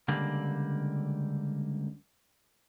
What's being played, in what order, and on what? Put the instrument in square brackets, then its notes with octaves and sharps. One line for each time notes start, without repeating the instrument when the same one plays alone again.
[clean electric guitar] C#2 D3 G3 A#3